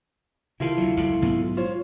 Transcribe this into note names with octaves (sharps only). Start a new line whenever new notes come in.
C3 D#3 E4 F4 A4
D2 F#3
F#1 C#2 C#3
B1 G#2 B3
F4 C5 C#5